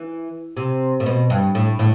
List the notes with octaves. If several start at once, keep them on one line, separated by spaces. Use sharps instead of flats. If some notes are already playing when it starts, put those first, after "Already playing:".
Already playing: E3
C3
A2
B2
G2
A2
A2